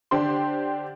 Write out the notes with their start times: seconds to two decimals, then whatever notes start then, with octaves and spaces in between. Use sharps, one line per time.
0.11 D3 D4 G4 C5 C6